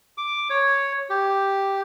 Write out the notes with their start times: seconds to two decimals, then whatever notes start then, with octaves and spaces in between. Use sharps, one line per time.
0.18 D6
0.50 C#5
1.10 G4